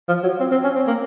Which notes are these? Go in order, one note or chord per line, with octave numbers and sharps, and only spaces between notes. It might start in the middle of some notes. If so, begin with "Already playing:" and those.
F3
F#3
C4
C4
C#4
C4
A#3